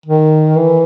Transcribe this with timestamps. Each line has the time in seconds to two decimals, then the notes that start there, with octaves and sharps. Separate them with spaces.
0.06 D#3
0.57 E3